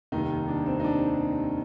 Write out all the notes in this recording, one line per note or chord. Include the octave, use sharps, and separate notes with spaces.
F1 D#2 D#3 G3 D#4
D4
C4
D#4
D4